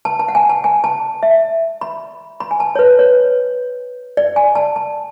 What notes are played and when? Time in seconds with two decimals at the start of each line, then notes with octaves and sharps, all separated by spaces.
0.05 A5
0.20 A5
0.28 F#5
0.35 G#5
0.49 A5
0.64 G#5
0.84 A5
1.23 E5
1.81 B5
2.40 B5
2.51 G#5
2.60 A5
2.75 C#5
2.79 B4
2.99 C#5
4.17 D5
4.36 G#5
4.55 A5
4.76 A5